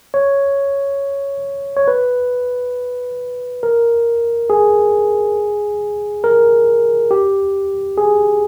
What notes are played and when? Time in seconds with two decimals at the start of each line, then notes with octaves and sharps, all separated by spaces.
0.14 C#5
1.77 C#5
1.88 B4
3.63 A#4
4.50 G#4
6.24 A#4
7.11 G4
7.98 G#4